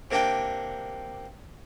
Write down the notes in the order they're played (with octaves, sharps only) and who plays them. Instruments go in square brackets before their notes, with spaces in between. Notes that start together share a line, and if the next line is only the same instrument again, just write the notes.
[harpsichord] C3 A#3 D4 G5